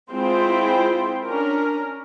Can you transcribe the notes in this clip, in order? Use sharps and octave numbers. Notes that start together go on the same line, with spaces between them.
G#3 C4 E4 F4 C5 G5
C#4 D4 A#4